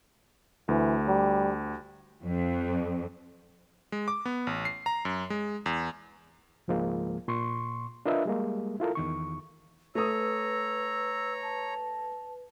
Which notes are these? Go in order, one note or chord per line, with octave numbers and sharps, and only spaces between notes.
D2 E3
G3
F2
G#3
D6
B3
A1
C7
A#5
F#2
G#3
E2
C#2 G#2 F3 G#3 A#3
A#2 C6 C#6
D4 F4 A#4 B4 D#5 E5
G3 G#3 A#3
E4 F4 A4 A#4
E2 D#3 C#6
A3 B4 C#5 A#5 D#6 E6
A5